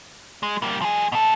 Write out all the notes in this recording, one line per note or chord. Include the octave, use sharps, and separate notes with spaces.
G#3
G3 A#3
F3 G#4
B2 A4